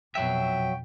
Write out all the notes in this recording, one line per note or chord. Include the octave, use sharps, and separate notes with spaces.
F2 B2 F#3 E5 G5